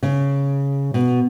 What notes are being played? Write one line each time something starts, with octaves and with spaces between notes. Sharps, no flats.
C#3
B2